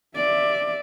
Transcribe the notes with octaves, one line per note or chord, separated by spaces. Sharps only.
D5 E5